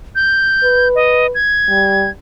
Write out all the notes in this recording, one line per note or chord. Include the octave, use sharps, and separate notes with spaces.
G6
B4
D#5
G#6
G3